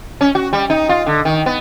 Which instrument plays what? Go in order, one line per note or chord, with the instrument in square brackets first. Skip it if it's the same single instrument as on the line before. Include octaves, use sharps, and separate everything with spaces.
[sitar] C#4
F#4
G3
D#4
F4
D3
D#3
B3